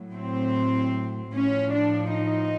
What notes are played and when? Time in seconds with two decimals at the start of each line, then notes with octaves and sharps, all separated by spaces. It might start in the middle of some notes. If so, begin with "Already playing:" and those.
Already playing: A2 F#3
0.14 C4
1.34 A2 F3 C#4
1.74 D4
2.14 D#4